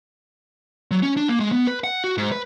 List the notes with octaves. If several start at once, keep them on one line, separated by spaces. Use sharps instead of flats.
F#3
C#4
D4
A#3
G#3
B3
B4
F#5
F#4
G#2
B4